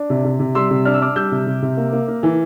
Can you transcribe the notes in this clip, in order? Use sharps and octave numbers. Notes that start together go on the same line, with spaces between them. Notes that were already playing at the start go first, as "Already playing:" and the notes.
Already playing: D4
C3
C3
C3
G3 C6 E6
C3
D4 F6
E6
D4 D6 F6
G3 E6 G6
C3
C3
C3
A#3
A#3
A#3
E3